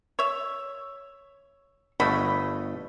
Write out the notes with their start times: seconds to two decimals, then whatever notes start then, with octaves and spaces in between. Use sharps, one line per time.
0.19 C#5 E5
2.00 G1 B2 A3 D#5 B5